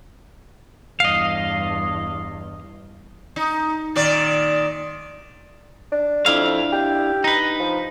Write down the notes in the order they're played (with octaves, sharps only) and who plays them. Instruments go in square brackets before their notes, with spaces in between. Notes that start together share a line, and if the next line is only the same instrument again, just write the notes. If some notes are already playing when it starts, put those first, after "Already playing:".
[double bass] E2 G2 [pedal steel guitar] D#5 F5
[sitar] D#4
A#2 D#3 D5
[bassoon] D4
[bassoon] F2 [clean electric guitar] D4 E4 F5
[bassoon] G4
[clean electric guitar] D#4 B4
[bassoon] F3